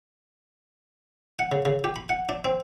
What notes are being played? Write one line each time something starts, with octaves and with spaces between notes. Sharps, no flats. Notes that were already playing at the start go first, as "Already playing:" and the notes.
F#5
C#3
C#3
G4
B5
F#5
D4
C4